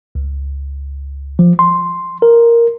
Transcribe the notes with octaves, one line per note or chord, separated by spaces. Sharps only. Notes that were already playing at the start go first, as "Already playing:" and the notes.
C#2
F3
C6
A#4